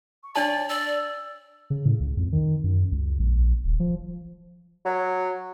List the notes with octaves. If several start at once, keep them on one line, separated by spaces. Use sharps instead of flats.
C#6
D4 C#5 D5 A5
D5 E6
C#3
A2
C#2
F2
D#3
F#2
C#2
A#1
D#1
F3
F#3